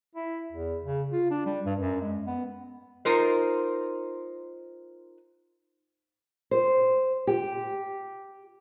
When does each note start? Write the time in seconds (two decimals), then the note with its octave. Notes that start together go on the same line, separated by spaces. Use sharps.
0.15 E4
0.52 E2
0.85 C#3
1.12 F4
1.31 D4
1.46 G3
1.66 G2
1.79 F#2
2.02 G#3
2.27 B3
3.05 D#4 F4 A#4 C5
6.51 C5
7.27 G4